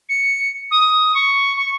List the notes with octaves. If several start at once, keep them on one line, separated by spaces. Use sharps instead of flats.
C#7
D#6
C#6
C#6